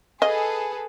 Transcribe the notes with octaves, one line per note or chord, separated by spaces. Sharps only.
G#4 A4 B4 D#5